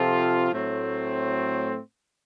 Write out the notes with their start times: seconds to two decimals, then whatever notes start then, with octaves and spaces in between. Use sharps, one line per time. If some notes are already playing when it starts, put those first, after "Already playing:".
Already playing: C3 F3 C4 F4 A4
0.51 A2 F#3 A3 C4